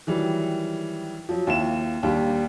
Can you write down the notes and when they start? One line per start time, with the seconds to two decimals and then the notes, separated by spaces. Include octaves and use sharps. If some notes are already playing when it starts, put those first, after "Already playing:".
0.07 D#3 E3 F#3 G3
1.29 F3 F#3
1.47 D#2 E4 F4 E7
2.03 D#2 G3 D4 G4